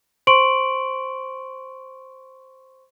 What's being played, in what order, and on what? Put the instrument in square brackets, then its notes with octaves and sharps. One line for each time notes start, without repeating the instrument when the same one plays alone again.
[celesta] C5 C6 C#6 D7 F#7